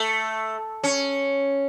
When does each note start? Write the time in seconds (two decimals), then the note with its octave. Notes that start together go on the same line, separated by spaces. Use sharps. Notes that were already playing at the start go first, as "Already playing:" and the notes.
Already playing: A3
0.84 C#4